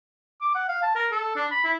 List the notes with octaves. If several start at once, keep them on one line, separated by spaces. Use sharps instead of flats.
D6
F#5
F5
A5
A#4
A4
D4
B5
E4